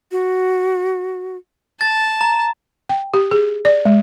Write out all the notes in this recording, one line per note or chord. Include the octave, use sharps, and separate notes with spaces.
F#4
A5 A6
A#5
G5
G4
G#4
D5
G#3